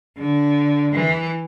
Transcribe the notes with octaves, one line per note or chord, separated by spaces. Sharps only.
D3
E3